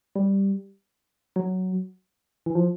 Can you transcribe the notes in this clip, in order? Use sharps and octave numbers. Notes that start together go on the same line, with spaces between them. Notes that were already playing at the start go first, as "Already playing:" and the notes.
G3
F#3
E3
F3